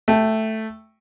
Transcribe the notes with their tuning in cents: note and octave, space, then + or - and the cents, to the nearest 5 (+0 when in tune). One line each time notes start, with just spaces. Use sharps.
A3 +0 G5 +0